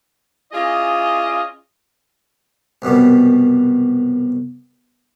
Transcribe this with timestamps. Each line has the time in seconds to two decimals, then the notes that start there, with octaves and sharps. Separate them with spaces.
0.52 C#4 E4 F4 G#4 D5 D#5
2.82 C2 F#2 B2 G3